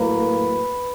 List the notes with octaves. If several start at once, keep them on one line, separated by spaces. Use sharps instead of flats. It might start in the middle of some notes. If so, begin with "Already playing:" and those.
Already playing: A2 F#3 A#3 B4